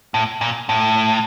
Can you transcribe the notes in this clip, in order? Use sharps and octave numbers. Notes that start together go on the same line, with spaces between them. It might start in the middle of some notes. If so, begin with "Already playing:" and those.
A2
A#2
A2